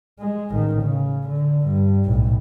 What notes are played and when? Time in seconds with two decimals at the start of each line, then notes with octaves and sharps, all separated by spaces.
0.20 G#3
0.51 A1 D#3
0.83 C#3
1.29 D3
1.66 G2
2.05 B1 A2